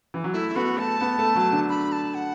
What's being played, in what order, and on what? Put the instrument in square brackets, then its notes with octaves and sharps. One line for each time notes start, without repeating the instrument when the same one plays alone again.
[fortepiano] E3
F#3
[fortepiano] A3 [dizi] E4
[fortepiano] A3
[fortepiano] B3 [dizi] F#4
[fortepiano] A3 [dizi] A5
[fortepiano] B3
A3
F#3
D3
[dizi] B5
A5
F#5